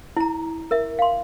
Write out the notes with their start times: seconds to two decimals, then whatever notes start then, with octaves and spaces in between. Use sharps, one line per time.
0.17 E4 A#5
0.71 A#4 E5
0.99 F5 C6